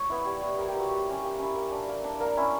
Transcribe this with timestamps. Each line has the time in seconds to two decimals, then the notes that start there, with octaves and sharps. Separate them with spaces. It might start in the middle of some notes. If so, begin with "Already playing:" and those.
Already playing: C#5
0.09 B3 E4
0.25 G3
0.41 B3 E4
0.57 G3 A#4
0.68 G4
0.74 B3 E4 F#4
0.90 A#3 G4
1.06 C#4 E4
1.23 A#3 G4
1.39 C#4 E4
1.56 A#3
1.71 D4
1.88 A#3
2.04 D4
2.20 A#3 A#4
2.37 C#4 E4